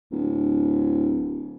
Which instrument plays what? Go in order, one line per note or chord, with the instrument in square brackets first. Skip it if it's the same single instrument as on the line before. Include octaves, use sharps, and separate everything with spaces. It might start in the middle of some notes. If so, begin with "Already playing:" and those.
[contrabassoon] D1